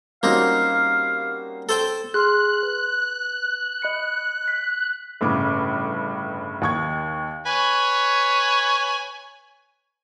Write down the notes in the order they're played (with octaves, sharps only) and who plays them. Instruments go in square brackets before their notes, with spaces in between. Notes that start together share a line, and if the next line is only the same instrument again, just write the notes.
[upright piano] G3 C#4 F#4 [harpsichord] A#3 C4 D#4 [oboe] F5
[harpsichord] A4 C5 G5
[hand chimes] G#4 C6 F6 [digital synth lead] F#6
[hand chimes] B4
D#5 B5 C#7
B6
[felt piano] G1 A2 C#3 D6
D#2 C#6 G#6
[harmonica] B4 C#5 G#5